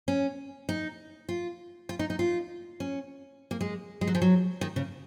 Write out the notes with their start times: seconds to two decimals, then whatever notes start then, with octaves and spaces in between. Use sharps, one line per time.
0.08 C#4
0.69 D#4
1.29 F4
1.89 F4
1.99 D#4
2.10 D#4
2.19 F4
2.80 C#4
3.51 A#3
3.61 G#3
4.01 G#3
4.07 F#3
4.15 F3
4.22 F#3
4.61 D#3
4.76 C#3